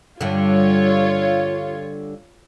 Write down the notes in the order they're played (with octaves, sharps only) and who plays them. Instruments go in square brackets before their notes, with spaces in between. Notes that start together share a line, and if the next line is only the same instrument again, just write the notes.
[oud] G2 D3 [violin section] F4 C#5